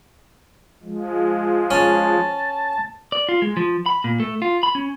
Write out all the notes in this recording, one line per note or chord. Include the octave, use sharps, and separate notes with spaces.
F3 G#3
C#4 A5
D5
F4
G#3
F3
B5
A#2
A3
F4
B5
C#4